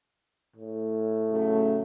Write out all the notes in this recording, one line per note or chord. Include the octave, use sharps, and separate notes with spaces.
A2
C#3 F#3 A3